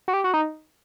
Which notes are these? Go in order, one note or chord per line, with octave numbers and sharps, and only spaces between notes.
F#4
G4
F#4
D#4